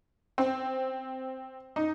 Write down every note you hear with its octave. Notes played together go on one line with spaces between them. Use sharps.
C4
D#4